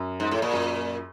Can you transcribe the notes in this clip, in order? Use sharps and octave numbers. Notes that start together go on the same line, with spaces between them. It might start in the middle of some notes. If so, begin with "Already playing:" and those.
Already playing: F#2
G#2
A2
A#2
F#2